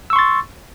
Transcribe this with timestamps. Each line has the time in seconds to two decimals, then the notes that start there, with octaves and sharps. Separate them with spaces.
0.10 E6
0.13 C#6
0.16 C6
0.19 A6